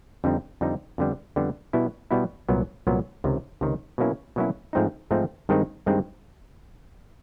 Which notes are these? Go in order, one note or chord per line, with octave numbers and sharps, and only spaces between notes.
F2 D3 G3 C4 D#4
F2 D3 G3 C4 D#4
F2 D3 G3 B3
F2 D3 G3 B3
B2 G3 B3 E4
B2 G3 B3 E4
C2 A#2 F#3 B3
C2 A#2 F#3 B3
C#2 C3 D#3
C#2 C3 D#3
B2 F#3 A#3 C#4 E4
B2 F#3 A#3 C#4 E4
G#2 F3 A3 C4 D#4
G#2 F3 A3 C4 D#4
G2 D#3 G#3 C4 D#4
G2 D#3 G#3 C4 D#4